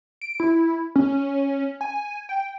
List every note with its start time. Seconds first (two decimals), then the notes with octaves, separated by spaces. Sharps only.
0.21 D7
0.40 E4
0.96 C#4
1.81 G#5
2.29 G5